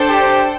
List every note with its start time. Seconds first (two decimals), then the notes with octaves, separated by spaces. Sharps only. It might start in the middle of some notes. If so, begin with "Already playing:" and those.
Already playing: D4 A4 C5 G5
0.10 G4